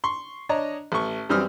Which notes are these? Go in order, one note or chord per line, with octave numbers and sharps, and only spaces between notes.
C6 C#6
D4 C#5 D#5 A#5
A1 C#6
F#2 E3 G3 C4 D#6 F6